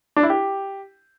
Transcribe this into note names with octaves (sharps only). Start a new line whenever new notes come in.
D4
E4
G4